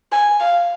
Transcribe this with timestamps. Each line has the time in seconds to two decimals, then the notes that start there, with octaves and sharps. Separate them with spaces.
0.12 G#5
0.40 F5